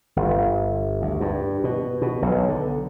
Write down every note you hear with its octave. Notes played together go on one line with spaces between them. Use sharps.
G1
D2
G2
B2
B2
B1
D3